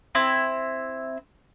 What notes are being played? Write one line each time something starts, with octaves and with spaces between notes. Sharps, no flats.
C4 E4